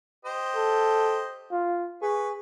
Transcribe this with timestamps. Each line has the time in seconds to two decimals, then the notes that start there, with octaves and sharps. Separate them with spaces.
0.25 G4 C5 D#5
0.56 A4
1.51 F4
2.02 G#4 B4 C#6